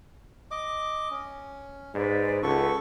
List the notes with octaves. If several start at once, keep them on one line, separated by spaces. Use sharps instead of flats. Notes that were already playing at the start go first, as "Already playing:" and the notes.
D#5 D6
C#4
G#2 B4 C5 D5
C#2 A4 B4 C#5 F#5 C#6